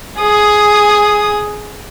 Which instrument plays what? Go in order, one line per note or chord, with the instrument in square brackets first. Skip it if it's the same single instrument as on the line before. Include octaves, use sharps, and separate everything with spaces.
[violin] G#4 D#6